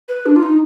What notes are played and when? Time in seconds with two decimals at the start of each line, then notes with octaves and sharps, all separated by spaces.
0.09 B4
0.26 D4
0.36 F4
0.43 D#4